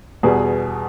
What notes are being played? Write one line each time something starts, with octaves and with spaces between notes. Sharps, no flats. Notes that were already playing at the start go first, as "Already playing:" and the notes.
E2 B2 G3 G#4